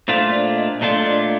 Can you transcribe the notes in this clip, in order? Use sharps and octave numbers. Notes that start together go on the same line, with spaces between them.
A#2 A3 D4 F4 C5
D5
D#5
A#2 A3 D4 F4 D5
D5